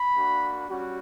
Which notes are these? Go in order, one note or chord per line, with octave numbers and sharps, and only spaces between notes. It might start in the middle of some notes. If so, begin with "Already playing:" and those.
Already playing: B5
A#3 D4 F#4
G3 C#4 F#4